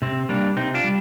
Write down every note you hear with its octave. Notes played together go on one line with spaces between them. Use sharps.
C3 C4
G3 A#3 D4
C3 C4 D#4
D4 F4
G3